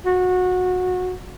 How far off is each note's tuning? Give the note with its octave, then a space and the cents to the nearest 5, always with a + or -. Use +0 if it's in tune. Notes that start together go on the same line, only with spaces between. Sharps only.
F#4 -20